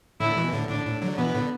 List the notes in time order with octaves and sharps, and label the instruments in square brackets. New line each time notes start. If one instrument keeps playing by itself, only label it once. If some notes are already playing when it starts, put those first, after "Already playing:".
[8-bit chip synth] A2 D3 [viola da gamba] E4
[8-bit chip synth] B2 E3
A2 D3
[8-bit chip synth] A2 D3 [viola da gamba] D4
[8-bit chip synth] A2
D3 F#3
[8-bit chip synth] B2 E3 [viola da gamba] B3
[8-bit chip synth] A2 D3